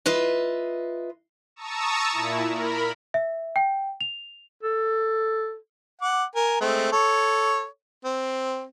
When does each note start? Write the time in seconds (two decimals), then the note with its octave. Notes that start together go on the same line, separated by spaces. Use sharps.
0.06 F4 B4 D#5 E5
1.56 A5 A#5 C#6 D#6 E6
2.12 A#2 E4
2.47 A#4 B5
3.14 E5
3.56 G5
4.01 F7
4.63 A4
6.02 F#5 D6
6.35 A#4 G#5
6.61 G#3 A3 C4
6.92 A4 C#5
8.05 C4